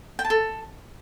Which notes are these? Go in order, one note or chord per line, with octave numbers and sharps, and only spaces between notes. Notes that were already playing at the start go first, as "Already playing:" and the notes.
G5
A5
A4